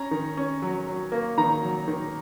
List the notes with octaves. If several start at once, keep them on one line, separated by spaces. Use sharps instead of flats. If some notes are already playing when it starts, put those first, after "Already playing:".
Already playing: C#4 A#5
D#3
C#4
F#3
F#3
A#3
D#3 A#5
F#3
D#3